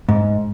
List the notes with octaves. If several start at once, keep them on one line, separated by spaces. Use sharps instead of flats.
G#2